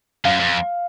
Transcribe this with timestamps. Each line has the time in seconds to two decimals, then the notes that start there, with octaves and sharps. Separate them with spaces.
0.25 F#2 F5
0.40 F2